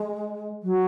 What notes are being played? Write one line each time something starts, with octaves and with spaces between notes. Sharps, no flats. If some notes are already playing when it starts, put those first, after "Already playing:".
Already playing: G#3
F#3